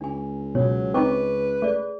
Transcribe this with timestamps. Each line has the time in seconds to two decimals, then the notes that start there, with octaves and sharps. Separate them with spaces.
0.01 C#2 D4 G#5
0.55 B2 F#3 C#5
0.94 C4 D#4 B4 D#5 C#6 D6
1.62 A3 G#4 D5